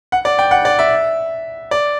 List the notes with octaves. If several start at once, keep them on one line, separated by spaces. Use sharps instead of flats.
F#5
D5
G5
F#5
D5
E5
D5